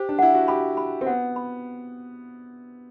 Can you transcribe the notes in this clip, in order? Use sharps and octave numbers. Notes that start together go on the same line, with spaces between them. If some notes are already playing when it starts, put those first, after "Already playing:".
Already playing: G4 C5
D4
E4 F#5
F#4
G4 B5
B5
C4
B3 F#5
B5